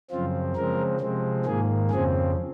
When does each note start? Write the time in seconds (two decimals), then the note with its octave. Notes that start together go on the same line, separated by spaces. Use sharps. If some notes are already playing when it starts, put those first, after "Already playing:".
0.11 F#2 C#3 F3 C4 F4
0.56 C#3 F3 G#3 C4 A#4
1.01 C3 F3 G#3 C4
1.46 G#2 D#3 A#3 G#4
1.90 F2 C#3 F3 C4 G#4